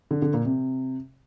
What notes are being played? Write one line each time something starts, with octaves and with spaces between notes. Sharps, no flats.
D3
D3
A#2
C3